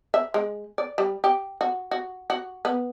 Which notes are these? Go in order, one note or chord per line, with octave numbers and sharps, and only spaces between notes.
E5
G#3
D5
G3
G4
F#4
F#4
F#4
B3